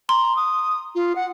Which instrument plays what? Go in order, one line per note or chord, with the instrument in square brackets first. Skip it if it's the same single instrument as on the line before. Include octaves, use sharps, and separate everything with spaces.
[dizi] A#5 [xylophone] C6
[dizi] D#6
F4
F#5